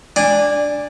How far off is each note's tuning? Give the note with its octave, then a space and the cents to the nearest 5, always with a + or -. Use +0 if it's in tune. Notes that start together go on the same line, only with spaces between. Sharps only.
D4 +0 G#5 -25